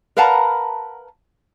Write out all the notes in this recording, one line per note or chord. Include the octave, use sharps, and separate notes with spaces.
A#4 B4 F5 F#5 A5 A#5